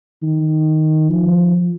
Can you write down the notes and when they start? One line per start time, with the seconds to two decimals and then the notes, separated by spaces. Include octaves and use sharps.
0.23 D#3
1.10 F3